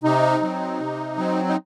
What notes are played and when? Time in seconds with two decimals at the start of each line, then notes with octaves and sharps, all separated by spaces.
0.04 C3 D#4
0.42 F#3 C4
0.80 C3
1.18 F#3 C4
1.49 D#4